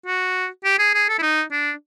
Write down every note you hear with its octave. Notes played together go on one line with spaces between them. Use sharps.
F#4
G4
G#4
G#4
A4
E4
D#4
D4